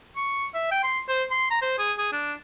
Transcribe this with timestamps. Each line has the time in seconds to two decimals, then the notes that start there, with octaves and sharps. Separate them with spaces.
0.16 C#6
0.54 E5
0.71 G5
0.83 C6
1.09 C5
1.31 C6
1.50 A#5
1.62 C5
1.79 G#4
1.98 G#4
2.12 D4